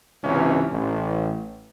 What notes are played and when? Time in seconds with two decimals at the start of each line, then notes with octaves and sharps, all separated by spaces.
0.23 C#2 G#2 C3 E3 C#4
0.71 A1